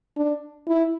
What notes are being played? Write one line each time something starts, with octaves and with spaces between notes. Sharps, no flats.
D4
E4